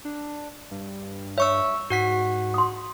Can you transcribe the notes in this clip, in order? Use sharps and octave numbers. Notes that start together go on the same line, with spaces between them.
D4
G2
C#5 E5 C#6 E6
G#2 F#4 F#5 B6
C6 D#6